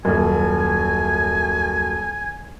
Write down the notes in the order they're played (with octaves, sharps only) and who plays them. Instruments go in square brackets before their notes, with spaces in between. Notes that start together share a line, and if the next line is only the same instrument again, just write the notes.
[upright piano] D#1 F#2 [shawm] G#5